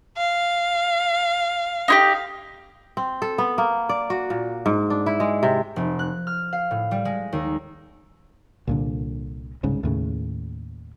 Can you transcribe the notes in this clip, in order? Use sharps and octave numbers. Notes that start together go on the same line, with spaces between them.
F5
D#4 E4 G4
C4
A4
B3
A#3
D5
F#4
A#2
G#2
D4
E4
G#3
C3
F1
F#6
F6
F5
A2
G3
G#3
D#2
C2 A#2 D3
G1 C2 G#2 C#3
D#2 A2 C#3